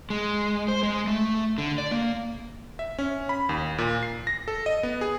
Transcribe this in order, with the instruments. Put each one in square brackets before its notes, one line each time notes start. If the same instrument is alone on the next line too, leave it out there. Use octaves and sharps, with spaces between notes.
[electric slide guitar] G#3
C5
G#3
A3
D3
D5
A#3
[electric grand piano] E5
C#4
B5
D#2
A#2
C7
A#6
A4
D#5
B3
G#4